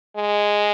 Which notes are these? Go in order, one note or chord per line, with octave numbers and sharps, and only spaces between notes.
G#3